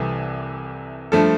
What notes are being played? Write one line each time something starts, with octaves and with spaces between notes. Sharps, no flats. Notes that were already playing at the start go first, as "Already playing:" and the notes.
Already playing: C2 C3 E3 A4
G2 F3 A3 A4